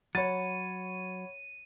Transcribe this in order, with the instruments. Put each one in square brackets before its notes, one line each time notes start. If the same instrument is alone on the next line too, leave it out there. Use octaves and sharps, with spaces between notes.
[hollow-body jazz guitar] F#3 [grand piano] C#5 A6 [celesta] F#5 B5 C#7 [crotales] D#7